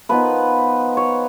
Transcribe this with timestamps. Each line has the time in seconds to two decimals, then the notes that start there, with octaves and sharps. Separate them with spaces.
0.09 F3 B3 D#4 B4
0.97 C#5